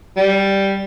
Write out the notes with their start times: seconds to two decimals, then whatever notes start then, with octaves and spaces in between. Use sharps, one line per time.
0.17 G3